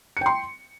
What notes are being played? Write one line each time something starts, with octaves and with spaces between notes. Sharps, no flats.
G5 C6 C#7